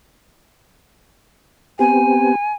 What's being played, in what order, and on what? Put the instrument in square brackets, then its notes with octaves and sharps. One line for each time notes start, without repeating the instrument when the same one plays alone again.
[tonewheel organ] B3 C4 G4 [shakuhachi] G#5